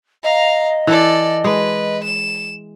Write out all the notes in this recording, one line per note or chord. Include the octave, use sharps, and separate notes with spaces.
D#5 F5 A#5
E3 A4 D5
G#3 B4
E7